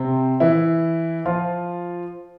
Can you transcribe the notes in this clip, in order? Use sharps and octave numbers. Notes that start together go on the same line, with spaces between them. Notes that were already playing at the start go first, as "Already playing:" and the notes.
Already playing: C3 C4
E3 E4
F3 F4